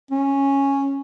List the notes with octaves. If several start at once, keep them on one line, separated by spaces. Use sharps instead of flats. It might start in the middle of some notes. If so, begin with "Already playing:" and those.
C#4